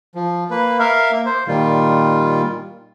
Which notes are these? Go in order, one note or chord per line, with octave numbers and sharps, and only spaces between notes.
F3
A#3 B4
A#4 E5 F5
A#3
C5
A#2 D#3 G3 F4